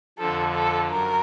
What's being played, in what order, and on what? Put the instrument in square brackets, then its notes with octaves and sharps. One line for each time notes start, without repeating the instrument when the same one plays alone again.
[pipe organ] F2 D3 F3 [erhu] A4
[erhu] A4
[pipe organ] F#2 [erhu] A#4